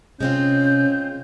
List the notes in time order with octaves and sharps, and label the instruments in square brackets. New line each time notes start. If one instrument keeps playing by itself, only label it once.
[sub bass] C3 [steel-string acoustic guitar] G#3 C4 F4 [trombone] C#4 [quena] G6